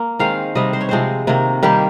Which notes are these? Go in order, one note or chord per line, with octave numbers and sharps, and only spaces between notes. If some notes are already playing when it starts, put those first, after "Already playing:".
Already playing: A#3
D#3 G#3 C4 F5
C3 G3 C4 D#5
C5
C#5
C3 F3 G#3 C4 C5
C3 D#3 A#3
D#3 G3 A#3 G4